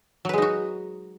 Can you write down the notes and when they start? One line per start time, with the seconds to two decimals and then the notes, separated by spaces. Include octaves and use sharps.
0.25 F#3
0.29 B4
0.33 G#3
0.38 D#4
0.42 F#4